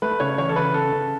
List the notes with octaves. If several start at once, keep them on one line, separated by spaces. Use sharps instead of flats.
A3 B4
C#3 C#5
E3 C#5
A4
C#3 B4
C#3 A4
C#3